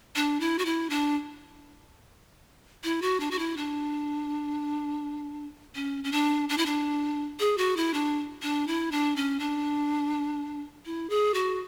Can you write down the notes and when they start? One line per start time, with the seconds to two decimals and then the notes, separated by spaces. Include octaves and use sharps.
0.16 D4
0.40 E4
0.59 F#4
0.65 E4
0.90 D4
2.84 E4
3.02 F#4
3.20 D4
3.31 F#4
3.39 E4
3.57 D4
5.75 C#4
6.04 C#4
6.12 D4
6.49 D4
6.58 E4
6.66 D4
7.40 G#4
7.58 F#4
7.77 E4
7.94 D4
8.42 D4
8.67 E4
8.92 D4
9.16 C#4
9.39 D4
10.86 E4
11.10 G#4
11.34 F#4